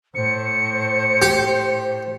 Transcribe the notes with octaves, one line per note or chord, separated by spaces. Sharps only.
A2 C5 C#7
G4